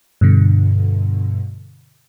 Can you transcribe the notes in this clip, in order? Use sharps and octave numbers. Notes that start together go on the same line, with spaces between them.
G2 B2 D3